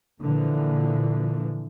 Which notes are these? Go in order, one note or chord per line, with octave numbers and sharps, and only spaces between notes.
A#2 D3 E3 F3